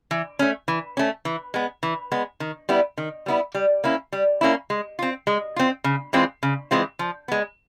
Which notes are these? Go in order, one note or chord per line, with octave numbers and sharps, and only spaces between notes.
E3
A3 C#4
E3
A3 C#4
E3
G#3 B3
E3
G#3 B3
D#3
G3 B3 E4
D#3
G3 B3 E4
G3
A#3 C#4 E4
G3
A#3 C#4 E4
G#3
C4 F4
G#3
C4 F4
C#3
E3 G#3 C4 F4
C#3
E3 G#3 C4 F4
F3
G#3 B3